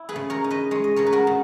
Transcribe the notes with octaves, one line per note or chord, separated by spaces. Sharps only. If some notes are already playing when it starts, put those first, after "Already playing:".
Already playing: E4
G#4 B4
C#3
A#4 C#5
D#4
B4 D#5
G#3 C#5
D#5
C#3 A#4 C#5
B4
F#4 A#4
C#3